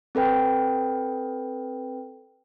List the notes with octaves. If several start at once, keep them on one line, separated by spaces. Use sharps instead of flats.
C4 A4 B4 G5